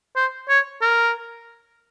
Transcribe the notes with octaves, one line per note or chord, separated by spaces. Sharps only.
C5
C#5
A#4